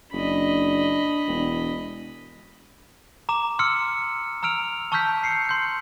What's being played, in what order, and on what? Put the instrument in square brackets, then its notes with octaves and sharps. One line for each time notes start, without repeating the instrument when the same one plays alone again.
[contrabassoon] F#1 [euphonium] D4 [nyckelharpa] D#5 B5
[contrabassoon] E1
[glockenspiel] A#5 D6 E7
C6 E6 F6 C#7
A#5 E6 F6 D7 F7
A5 C#6 E6 F6 G6 B6
C7 C#7
C6 G6